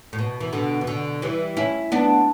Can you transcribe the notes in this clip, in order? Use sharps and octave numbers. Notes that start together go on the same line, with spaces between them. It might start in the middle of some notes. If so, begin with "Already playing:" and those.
A2
B2
E3
B2 D3
E3
B2 D3
E3 G3
C#4 E4
B3 D4